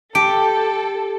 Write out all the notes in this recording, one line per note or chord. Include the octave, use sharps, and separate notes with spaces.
G4 A4 A5 D7